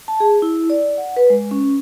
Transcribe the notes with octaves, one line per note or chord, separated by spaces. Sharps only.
A5
G#4
E4
D5
F#5
B4
G#3
C#4